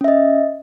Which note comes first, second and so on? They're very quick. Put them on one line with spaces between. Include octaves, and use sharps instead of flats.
C#4 E5 D#5